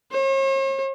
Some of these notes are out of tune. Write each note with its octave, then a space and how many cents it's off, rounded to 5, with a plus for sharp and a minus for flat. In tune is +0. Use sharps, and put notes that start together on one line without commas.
C#5 -45